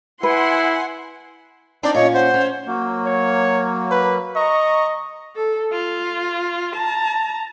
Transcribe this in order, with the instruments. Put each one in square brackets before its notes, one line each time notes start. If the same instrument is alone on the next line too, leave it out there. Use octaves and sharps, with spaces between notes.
[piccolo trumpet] E4 [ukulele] B4 [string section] F#5 G#5 C6
[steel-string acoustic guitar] C4 D4 D#4 [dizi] D5
[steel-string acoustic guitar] A#2 C#4 [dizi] C#5 [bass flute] D#5
[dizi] C5 [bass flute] F#5
[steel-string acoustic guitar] C#4
[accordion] F#3 A#3
[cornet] C#5
B4
[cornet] D#5 [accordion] A#5 C#6
[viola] A4
F4
A5 A#5